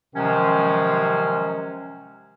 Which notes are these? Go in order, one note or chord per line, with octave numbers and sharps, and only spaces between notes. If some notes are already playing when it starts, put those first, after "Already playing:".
C3 D#3 F3 F#3 G#3 C#4